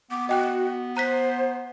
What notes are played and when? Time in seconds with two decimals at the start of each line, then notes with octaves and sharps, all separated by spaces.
0.11 B3 D6
0.29 F#4 D#5 G5 F#6
0.97 C5 A#5 F#6 B6